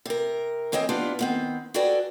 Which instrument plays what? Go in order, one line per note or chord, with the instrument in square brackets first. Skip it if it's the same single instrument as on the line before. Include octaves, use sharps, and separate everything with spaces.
[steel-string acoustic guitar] C3 A#4
E3 C4 C#5 D#5 G5
B3 D4 E4 F4 G4
D#3 B3 C4
F#4 G#4 A4 B4 D5 G5